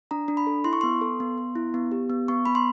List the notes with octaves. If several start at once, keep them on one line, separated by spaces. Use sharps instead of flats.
D4 A#5
D4
B5
A4
E4 C6
C#6
B3 C6
A4
B3
B3
E4
B3
G4
B3
B3 C#6
B3 B5
C6